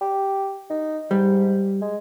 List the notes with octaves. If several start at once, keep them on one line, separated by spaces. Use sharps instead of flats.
G4
D#4
G#2 G3
G#3